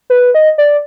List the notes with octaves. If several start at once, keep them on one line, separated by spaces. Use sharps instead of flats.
B4
D#5
D5